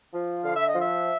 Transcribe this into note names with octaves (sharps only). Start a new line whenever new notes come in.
F3
D3 F5
E5
D#5
F3
E5